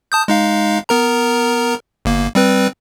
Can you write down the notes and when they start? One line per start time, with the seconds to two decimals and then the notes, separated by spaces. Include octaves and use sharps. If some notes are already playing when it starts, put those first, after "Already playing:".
0.12 A5 D#6 G6
0.28 G#3 D#4 F5
0.89 B3 A#4 A#5
2.05 G1 A#3
2.35 G3 C4 B4